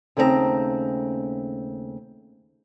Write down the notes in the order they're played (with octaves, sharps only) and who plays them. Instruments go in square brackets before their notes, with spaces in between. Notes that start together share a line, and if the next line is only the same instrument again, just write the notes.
[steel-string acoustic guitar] D#2 C#3 A3 C4 A4 A#5